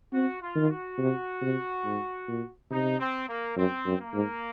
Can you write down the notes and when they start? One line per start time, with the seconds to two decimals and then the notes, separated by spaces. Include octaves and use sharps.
0.13 C4 F#4
0.41 F4
0.55 D#3
0.70 F#4
0.98 C3
1.42 C3
1.84 G#2
2.28 A#2
2.70 C3 D#4
3.00 C4
3.28 A#3
3.56 F#2 C4
3.86 F#2
4.00 A#3
4.14 G#2